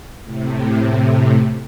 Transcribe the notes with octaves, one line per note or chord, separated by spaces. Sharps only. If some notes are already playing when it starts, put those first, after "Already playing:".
A2 C3